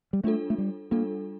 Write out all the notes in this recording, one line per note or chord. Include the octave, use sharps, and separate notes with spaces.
G3
G3 A3 D4 F4 A4
A3
G3
G3 A#3 D4 F4 A4